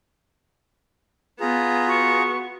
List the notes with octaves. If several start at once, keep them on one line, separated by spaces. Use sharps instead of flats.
B3 F4 G#4 A#5
F#4 C#6